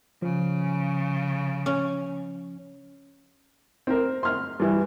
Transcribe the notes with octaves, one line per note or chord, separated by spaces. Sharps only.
C#3 F3
C#4
C4 A#4
C6 F6
G2 E3